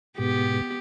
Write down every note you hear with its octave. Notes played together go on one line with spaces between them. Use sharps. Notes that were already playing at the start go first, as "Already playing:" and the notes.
G#2 B2 B3 G4